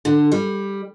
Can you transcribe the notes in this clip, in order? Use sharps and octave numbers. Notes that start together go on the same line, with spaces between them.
D3
G3